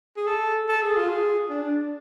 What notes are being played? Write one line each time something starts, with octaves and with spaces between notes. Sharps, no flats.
G#4
A4
A4
G#4
F4
G#4
D4